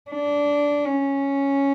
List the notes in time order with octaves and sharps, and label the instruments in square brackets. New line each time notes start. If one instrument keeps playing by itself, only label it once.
[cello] D4
C#4